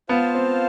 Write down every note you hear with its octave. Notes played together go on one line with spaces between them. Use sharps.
B3 F4 C5 F5 A5
C4